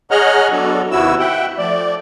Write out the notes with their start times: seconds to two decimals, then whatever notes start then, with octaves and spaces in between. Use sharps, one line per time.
0.11 G#4 C#5 D#5 F#5 A#5 F6
0.52 F#3 B3 D4 F#4 A4
0.91 D#2 C3 B3 E4 F#4 E6
1.19 E5 F#5 G5
1.58 F3 A3 D5